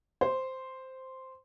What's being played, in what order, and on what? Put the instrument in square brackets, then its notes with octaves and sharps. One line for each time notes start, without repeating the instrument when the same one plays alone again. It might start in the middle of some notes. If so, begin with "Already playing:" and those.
[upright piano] C5